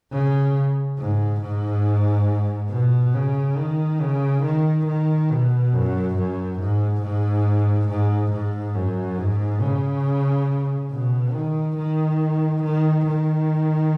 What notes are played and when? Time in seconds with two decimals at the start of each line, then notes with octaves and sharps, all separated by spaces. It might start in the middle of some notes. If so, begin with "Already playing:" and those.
0.12 C#3
0.98 G#2
1.42 G#2
2.70 B2
3.14 C#3
3.57 D#3
4.01 C#3
4.44 D#3
4.86 D#3
5.30 B2
5.73 F#2
6.16 F#2
6.59 G#2
7.02 G#2
7.89 G#2
8.32 G#2
8.75 F#2
9.18 G#2
9.61 C#3
10.91 B2
11.34 D#3
11.77 D#3
12.63 D#3
13.06 D#3